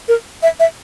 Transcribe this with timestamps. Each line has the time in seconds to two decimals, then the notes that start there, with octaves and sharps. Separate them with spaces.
0.08 A#4
0.43 E5
0.60 E5